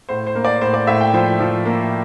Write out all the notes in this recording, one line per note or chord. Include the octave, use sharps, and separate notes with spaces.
A2 C5
C5
A#3
D5
A2 C5
D5
A2 E5
G5
F3 C5
F3
A#3